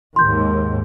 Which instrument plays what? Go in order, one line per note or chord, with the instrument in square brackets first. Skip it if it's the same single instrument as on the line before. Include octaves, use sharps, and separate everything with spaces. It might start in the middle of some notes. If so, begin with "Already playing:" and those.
[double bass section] D#2 G#2 [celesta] C6 G6